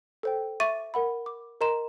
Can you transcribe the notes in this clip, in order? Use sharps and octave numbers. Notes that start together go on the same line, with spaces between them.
A4 C5 G5
E5 C#6 D6 A6 D#7
A#4 F#5 B5
D6
A#4 D#5 A#5 C6 E7